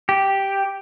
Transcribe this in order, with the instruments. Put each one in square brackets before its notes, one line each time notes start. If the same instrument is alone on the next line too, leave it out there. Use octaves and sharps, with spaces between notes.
[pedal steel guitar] G4